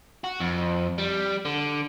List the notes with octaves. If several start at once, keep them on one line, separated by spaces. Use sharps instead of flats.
F#4
F2
G3
D3